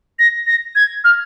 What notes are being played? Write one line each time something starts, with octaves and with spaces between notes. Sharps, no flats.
A#6
A#6
G#6
F6